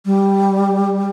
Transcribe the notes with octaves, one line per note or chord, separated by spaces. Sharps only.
G3